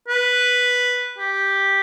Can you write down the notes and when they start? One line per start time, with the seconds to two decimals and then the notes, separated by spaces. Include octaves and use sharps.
0.08 B4
1.18 G4